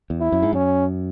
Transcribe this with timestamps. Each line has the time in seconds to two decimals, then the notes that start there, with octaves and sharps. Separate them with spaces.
0.10 E2
0.21 E4
0.32 F#2
0.43 G#2
0.53 F#2 C#4